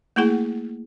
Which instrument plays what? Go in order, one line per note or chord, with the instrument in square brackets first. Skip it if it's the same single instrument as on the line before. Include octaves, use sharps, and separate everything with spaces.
[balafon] A3 A#3 E4 G#4 F#5